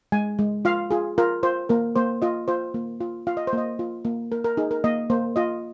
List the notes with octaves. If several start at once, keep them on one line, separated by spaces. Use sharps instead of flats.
G#3 G#5
G#3
F4 F5
F4 G#4
F4 A#4
F4 C5
A#3 A#4
A#3 C5
F4 D#5
F4 C5
A#3
F4
F4 F5
D#5
C5
A#3 D#5
F4
A#3
A#3 A#4
A#4
D#4 G#4
A#4
A#3 D#5
A#3 C5
F4 D#5